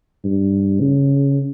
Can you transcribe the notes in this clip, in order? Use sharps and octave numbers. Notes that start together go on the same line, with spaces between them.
G2
C#3